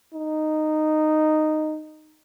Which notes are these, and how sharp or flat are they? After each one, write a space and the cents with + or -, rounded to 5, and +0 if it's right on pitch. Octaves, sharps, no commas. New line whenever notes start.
D#4 -10